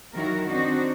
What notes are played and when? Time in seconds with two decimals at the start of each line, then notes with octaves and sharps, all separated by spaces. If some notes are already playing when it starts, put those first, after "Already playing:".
0.14 D#3 F#3 E4 F#4 A#4
0.47 C4 D4 D#4 F#4